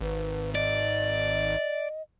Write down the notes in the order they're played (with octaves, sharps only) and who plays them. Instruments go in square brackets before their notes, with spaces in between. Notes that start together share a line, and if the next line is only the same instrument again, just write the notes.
[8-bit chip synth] G#1 [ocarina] B4
[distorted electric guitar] D5 [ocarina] D#5